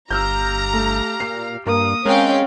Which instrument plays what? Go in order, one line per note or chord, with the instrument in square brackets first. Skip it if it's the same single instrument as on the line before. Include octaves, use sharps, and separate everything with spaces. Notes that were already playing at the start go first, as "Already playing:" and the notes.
[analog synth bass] G1 [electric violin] G4 F5 [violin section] A#5 [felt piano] E6 F6 G6
[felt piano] A3
[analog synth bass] A#2 [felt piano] C7
[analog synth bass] G2 [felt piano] A#3 A#4 [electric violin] D#6
[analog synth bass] G#3 [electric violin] C4 [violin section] C#4 F5 G5 [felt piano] A#4